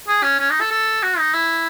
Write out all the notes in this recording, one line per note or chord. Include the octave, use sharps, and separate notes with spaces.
G#4
C#4
C#4
D#4
A4
A4
F#4
D#4
E4